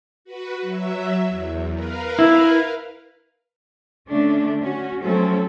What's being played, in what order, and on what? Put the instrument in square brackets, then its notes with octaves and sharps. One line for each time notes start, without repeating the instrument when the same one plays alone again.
[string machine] F#4 B4
F#3 E5
E2
A#4 B4 F5
[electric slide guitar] E4
[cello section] D3 A3 C#4 D4
C#4 F#4
F3 F#3 A3 C4 C#4 A4